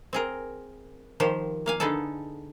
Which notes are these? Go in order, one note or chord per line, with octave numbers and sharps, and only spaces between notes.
C4 G#4 A#4
D#3 F3 G4 C5
A#3 F5 G#5
D3 B3 D#4 G#4 A4